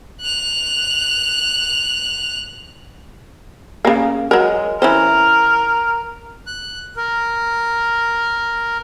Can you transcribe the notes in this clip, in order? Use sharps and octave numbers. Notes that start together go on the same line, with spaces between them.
F#6 F7
C#3 A#3
F#3 G#3 A#4
E3 C#4 A#4 C5
F#6
A#4